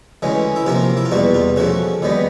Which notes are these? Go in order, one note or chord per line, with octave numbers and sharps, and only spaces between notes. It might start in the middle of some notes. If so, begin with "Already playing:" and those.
D2 C#3 E3 G#3 C#4
E4
C3 F3 A#3 F4
E4
F4
E2 B2 G3 F#4
F4
C#3 F3 A3 F#4
D#2 D#3 G3 B3